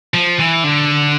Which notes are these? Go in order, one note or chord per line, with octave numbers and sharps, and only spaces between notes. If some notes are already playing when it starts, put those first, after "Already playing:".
F3
E3
D3